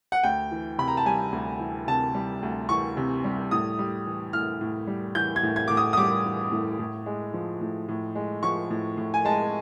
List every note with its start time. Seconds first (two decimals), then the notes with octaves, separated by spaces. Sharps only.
0.12 F#5
0.23 D2 G5
0.51 E3
0.78 C3 B5
0.88 A#5
0.97 A5
1.06 G3 G#5
1.32 D2
1.60 E3
1.87 C3 A5
2.14 G3
2.43 D2
2.69 E3 C#6
2.97 C3
3.24 G3
3.51 A2 D#6
3.79 G3
4.06 E3
4.33 A2 F6
4.61 A2
4.87 G3
5.15 E3 G6
5.36 G#6
5.43 A2
5.56 G#6
5.68 A2 D6
5.77 D#6
5.93 D#6
5.97 G3 D6
6.25 E3
6.52 A2
6.79 A2
7.06 G#3
7.34 F3
7.61 A2
7.88 A2
8.15 G#3
8.43 F3 C#6
8.70 A2
8.97 A2
9.14 G#5
9.25 G#3 A5